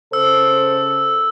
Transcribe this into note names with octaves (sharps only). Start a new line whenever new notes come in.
C#3 A4 C5 E6